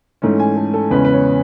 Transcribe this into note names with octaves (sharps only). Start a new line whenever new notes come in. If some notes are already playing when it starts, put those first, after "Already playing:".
G#2 E3 A3 C#4
G#5
A4
A4
E2 C#3 G#3 C#4 B4
B4
C#5